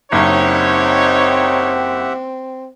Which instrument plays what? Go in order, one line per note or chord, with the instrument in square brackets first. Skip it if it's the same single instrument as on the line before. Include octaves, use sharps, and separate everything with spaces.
[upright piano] F#1 [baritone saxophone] C4 [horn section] D#4 C#5 [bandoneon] G4 E5 F#5